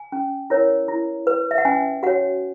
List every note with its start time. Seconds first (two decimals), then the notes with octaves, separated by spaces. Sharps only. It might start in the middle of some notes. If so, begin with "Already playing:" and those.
Already playing: G#5
0.12 C#4
0.50 E4 A#4 C#5
0.88 E4
1.27 B4
1.51 E5
1.58 F#5
1.65 C#4 G#5
2.03 F#4 C#5 F#5